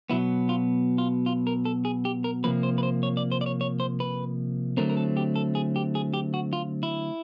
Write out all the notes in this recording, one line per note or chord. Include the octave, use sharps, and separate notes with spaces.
B2 F#3 B3 E4
F4
F4
F4
A#4
A4
G#4
G4
A#4
C3 F3 A#3 B4
C5
B4
C5
C#5
D5
C5
D5
C#5
C#5
C5
B4
D3 F#3 A3 C4 A#4
A#4
A4
G4
A4
G#4
G4
G#4
G4
F#4
F4
E4